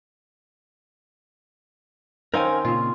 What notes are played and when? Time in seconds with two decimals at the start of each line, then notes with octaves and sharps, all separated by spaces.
2.34 D#3 C4 C#4 A#4 F5 G#5
2.65 A#2 C#3 F4